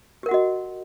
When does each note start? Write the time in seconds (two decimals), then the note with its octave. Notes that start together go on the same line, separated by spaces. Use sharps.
0.23 G4
0.26 A#4
0.29 F#5
0.31 F#4
0.34 D#5